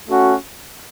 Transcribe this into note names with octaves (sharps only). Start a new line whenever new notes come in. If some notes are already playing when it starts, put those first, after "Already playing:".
A3 C#4 F#4